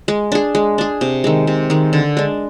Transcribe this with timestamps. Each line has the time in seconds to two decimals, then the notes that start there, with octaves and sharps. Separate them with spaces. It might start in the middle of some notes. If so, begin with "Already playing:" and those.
0.08 G#3
0.32 D4 G#4
0.55 G#3
0.78 D4 G#4
1.01 C3
1.24 D#3 G#3
1.47 C3
1.70 D#3 G#3
1.93 D3
2.17 G#3 D4